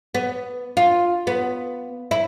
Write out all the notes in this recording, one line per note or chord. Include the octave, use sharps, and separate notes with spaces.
B3
F4
B3
E4